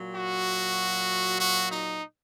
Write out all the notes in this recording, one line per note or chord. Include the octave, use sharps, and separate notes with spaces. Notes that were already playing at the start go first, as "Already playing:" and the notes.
Already playing: A#2 F#3
F#4
F#4
D#4